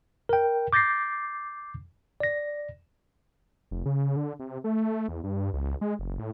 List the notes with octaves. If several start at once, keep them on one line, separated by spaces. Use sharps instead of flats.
A#4 G5
D6 G6 A6 A#6 C7
D5 A#6
F1
C#3
D3
C3
A3
E2
G2
C#2
G#3
F#1
A2